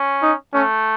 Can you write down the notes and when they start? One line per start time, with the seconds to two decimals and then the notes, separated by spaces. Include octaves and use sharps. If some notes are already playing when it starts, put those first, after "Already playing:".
Already playing: C#4
0.23 D#4
0.54 A3 C#4